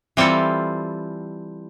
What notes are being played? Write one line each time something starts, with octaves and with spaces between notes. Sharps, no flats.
E3 G3 C4 F4 A4